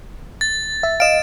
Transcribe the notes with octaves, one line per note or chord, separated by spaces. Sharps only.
A6
E5
D#5 F5 D7 E7